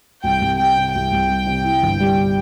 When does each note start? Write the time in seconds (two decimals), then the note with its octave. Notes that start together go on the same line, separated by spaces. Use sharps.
0.24 C2 G5
0.41 C2
0.59 G3 G5
0.77 C3
0.94 C2 G5
1.12 C2
1.29 G3
1.47 C3
1.65 E4
1.83 G1
2.00 G3